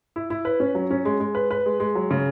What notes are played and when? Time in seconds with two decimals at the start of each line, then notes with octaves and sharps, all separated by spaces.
0.16 E4
0.30 E4
0.45 B4
0.60 C#4
0.75 F#3
0.91 C#4
1.05 G#3
1.20 G#3
1.35 B4
1.51 B4
1.66 G#3
1.80 G#3
1.95 F#3
2.11 C#3